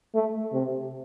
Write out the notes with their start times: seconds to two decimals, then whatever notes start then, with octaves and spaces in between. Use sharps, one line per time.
0.14 A3
0.53 C3